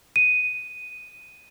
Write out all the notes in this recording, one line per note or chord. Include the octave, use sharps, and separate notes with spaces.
D#7